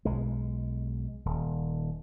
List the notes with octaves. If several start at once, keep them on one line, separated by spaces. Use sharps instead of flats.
B1 G#3
D#1